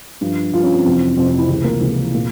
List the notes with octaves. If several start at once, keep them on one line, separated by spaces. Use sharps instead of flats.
G2 F3
G2 F3 F4
C#4
C4
F2 C3 E3 C4
F2 C3 E3 C4
C4
E4
C#2 C3 E3 C4
A#3
C#2 C3 E3
A#2